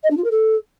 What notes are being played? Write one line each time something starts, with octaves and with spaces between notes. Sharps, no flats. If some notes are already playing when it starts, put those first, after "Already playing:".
D#5
D4
F4
A#4
A4